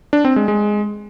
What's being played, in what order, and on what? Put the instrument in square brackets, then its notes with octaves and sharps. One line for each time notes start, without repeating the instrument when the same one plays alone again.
[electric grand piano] D4
C4
G#3
G#3